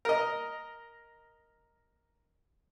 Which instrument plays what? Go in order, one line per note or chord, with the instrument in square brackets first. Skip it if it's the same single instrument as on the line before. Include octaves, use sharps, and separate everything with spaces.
[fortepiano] A#4 D#5